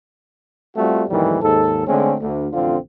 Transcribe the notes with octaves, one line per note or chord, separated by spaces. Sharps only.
G3 A3 C4 F4 F#4
A#1 F2 A2 D#3 E3 G3
D#2 G#2 A4
D3 G#3 A3 C4 C#4
D2
A1 F2 D3 C4 F4